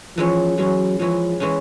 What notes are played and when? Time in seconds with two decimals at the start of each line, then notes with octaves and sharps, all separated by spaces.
0.17 E3 F3 G#3 C#4
0.58 E3 F#3 G#3 C#4
0.99 E3 F3 G#3 C#4
1.40 E3 G#3 C#4